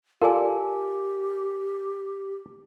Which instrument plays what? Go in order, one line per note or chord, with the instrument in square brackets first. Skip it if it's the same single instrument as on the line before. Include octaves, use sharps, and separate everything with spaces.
[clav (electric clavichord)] F4 A4 D5 [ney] G4 [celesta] A#4 G#5